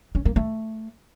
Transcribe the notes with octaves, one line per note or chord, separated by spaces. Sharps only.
C#4
A#3
A3